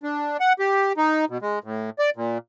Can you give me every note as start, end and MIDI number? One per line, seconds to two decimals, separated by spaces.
0.03 0.37 62
0.40 0.53 78
0.59 0.93 67
0.97 1.25 63
1.29 1.38 47
1.42 1.59 56
1.64 1.90 45
1.99 2.10 74
2.16 2.38 46